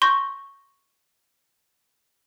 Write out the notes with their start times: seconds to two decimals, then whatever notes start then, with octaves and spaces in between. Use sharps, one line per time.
0.02 C6 C#6 G6 A#6